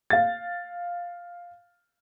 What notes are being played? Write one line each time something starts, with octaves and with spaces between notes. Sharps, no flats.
F5 A6